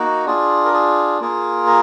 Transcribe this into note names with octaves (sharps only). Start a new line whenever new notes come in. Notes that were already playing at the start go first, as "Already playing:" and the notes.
Already playing: A#3 D#4 F#4
D4 F4 G#4
A#4
G#4
A#3 F4 G#4
A#4